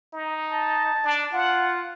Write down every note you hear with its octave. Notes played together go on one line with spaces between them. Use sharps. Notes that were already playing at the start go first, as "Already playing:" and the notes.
D#4
A5
D4
F4 F#5